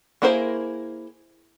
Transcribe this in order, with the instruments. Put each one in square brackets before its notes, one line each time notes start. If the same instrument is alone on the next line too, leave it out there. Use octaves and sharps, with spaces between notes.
[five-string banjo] A#3 E4 G#4 A#4 C5